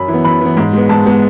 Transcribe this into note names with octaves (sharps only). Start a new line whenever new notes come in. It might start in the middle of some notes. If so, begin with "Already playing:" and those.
Already playing: F#2 B5
E3
B3
F#2 B5
E3 B3
G#2
G#3 B3
G#2 A5
G#3 B3